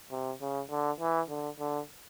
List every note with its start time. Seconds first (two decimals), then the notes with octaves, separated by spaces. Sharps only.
0.11 C3
0.41 C#3
0.70 D3
1.00 E3
1.29 D3
1.59 D3